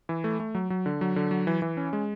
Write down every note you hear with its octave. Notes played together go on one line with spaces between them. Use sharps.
E3
A3
A3
F#3
F#3
D3
F#3
D3
F#3
E3
E3
C#4
G#3